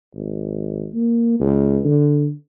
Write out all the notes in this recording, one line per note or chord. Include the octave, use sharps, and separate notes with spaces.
G#1
A#3
C#2
D3